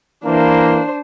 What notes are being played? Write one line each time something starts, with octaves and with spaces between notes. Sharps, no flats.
E3 A#3 D4 C5